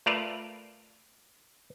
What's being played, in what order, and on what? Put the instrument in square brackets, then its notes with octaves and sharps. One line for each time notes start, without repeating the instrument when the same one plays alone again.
[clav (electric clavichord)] A3 F4 A#4 B4 D5 F5